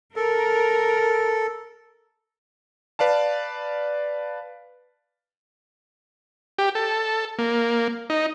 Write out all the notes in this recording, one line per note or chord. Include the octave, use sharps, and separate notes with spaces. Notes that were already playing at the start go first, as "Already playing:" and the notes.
A4 A#4
B4 D5 F5 A5
G4
A4
A#3
D#4